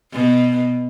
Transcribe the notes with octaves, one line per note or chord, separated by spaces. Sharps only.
B2